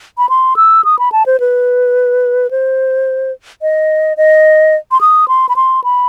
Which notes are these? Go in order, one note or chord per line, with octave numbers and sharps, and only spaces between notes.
B5
C6
E6
D#6
B5
A5
C5
B4
C5
D#5
D#5
C6
D#6
C6
B5
C6
B5